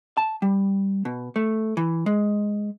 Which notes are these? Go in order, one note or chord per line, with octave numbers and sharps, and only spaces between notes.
A5
G3
B2
A3
E3
G#3